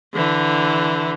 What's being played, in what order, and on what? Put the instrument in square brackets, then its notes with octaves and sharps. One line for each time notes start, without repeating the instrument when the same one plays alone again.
[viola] D3 E3